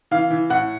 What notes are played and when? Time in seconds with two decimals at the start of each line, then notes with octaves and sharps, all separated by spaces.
0.11 E3 F5
0.30 E3
0.50 A2 F#5